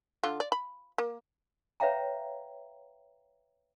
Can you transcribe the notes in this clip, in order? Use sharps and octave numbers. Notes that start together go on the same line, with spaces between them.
D3 F4
D5
B5
A#3
B4 C#5 E5 F5 G5 A#5